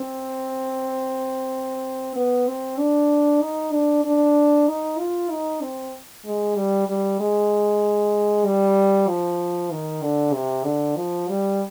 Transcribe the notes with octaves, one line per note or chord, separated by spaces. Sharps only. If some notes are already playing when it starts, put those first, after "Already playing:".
Already playing: C4
B3
C4
D4
D#4
D4
D4
D#4
F4
D#4
C4
G#3
G3
G3
G#3
G3
F3
D#3
D3
C3
D3
F3
G3